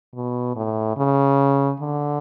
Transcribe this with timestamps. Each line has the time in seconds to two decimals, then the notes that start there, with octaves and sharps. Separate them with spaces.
0.15 B2
0.56 A2
0.97 C#3
1.80 D3